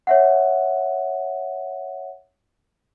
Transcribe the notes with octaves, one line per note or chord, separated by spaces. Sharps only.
C#5 E5 F#5